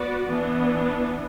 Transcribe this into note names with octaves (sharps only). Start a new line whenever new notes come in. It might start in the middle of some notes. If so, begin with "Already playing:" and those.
Already playing: B3 F#4 B4 D5
E3 B3 D4